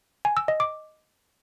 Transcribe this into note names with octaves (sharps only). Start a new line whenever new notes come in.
G#5
E6
D#5
D6